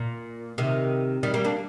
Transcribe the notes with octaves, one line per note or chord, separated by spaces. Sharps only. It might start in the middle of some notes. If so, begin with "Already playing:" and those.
Already playing: A#2
C3 D#3
D#3 G3
G3 A#3
A#3 D4